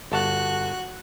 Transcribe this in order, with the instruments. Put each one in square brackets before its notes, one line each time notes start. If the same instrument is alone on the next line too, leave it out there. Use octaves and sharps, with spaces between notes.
[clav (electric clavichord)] G1 A5 [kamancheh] F#4 F#6